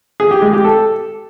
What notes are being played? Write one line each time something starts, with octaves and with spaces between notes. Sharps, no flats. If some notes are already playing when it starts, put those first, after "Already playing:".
G#4
G4
G#3
G4
A4